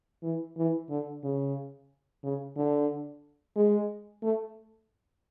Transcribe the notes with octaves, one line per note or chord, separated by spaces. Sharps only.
E3
E3
D3
C#3
C#3
D3
G#3
A3